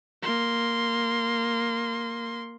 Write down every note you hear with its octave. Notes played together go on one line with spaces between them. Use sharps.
A#3 C6